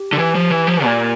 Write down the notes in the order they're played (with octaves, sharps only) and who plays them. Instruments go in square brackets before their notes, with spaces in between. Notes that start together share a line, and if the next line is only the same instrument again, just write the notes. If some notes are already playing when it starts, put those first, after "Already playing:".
Already playing: [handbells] G4
[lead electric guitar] D3
E3
F3
E3
F3
A#2